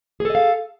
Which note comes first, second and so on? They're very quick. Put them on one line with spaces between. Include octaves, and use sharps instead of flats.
G#4 A4 D#5 F5